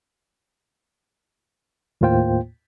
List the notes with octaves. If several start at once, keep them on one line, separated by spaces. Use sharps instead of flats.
D#2 A2 A#3 F4 C5 G5